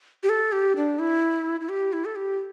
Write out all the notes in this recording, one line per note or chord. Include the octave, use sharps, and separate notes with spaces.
G4
A4
G4
D4
E4
E4
G4
E4
A4
G4